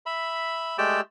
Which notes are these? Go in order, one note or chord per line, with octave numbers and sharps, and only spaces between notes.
E5 B5
G#3 A3 G4 D5 G5 E6